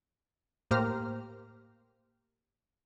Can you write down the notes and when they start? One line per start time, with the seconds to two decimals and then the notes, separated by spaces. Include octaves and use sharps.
0.71 A2 A#3 G4 C5 A#5 F6